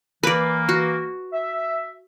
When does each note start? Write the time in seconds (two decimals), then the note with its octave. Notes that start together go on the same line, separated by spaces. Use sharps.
0.23 E3 A#3 B4 D5
0.69 F#4
1.33 E5